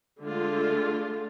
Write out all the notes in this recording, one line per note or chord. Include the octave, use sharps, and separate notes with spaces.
D3 G#3 A3 F4